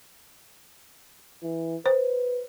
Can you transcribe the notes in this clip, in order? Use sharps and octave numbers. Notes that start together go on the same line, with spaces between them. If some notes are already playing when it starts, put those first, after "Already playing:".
E3
B4 C5